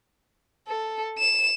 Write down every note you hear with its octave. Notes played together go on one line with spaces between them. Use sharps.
A4
E7